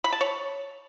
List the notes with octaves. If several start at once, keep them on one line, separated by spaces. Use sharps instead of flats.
B5
A5
C#5